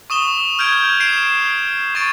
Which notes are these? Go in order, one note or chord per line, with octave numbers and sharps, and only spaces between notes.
C#6 D#6 E7 G7
F6 G6 G#6 D7
C7 D7 E7
C#6 A6 D7